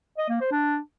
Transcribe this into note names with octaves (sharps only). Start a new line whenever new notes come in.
D#5
A#3
C5
D4